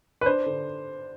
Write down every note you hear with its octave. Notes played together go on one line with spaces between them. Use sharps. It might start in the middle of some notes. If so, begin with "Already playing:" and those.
B4
D4 C5
D3